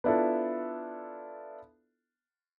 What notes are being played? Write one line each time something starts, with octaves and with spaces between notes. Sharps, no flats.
B3 D4 E4 F4 A4